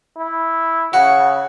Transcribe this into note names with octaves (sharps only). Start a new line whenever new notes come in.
E4
C#3 F#4